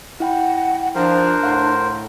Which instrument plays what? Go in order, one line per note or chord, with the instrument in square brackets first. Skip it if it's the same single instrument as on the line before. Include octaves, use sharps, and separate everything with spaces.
[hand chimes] E4 G5 B5 [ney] F#5
[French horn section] F3 [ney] D4 [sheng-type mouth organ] A#4 C5
[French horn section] A2 [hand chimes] F5 F#5 C6